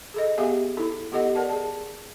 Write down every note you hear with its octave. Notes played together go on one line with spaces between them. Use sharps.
G#4 A4 D#5
B3 G4 G#4 E5 F5 G#5
D#4 E4 A4
B3 F4 G4 A4 D#5 F#5
A#4 D5 F#5 A5
G#4 A5